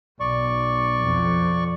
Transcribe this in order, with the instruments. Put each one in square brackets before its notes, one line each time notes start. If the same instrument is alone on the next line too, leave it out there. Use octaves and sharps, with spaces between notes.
[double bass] B1 [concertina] D5 C#6
[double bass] F2